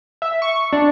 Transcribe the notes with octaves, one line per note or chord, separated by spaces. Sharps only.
E5
C#6
D4